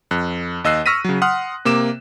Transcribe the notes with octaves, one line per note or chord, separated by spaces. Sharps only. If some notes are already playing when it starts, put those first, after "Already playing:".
F2 F#6
D#2 D#5 E6 F#6 C7
C#6 E6 F6 A#6 B6 D#7
C#3 F#3
F#5 C6 D#6 F6 F#6
C3 A#3 D6 E7